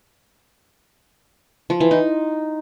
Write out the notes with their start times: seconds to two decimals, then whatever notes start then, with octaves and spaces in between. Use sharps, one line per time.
1.70 F3
1.80 E3
1.91 D#4